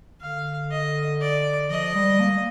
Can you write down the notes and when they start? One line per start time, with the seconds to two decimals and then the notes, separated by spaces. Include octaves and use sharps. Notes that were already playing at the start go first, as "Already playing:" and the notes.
0.21 D3 F5
0.71 D#5
1.21 D5
1.70 F3 D#5
1.95 G3
2.20 A#3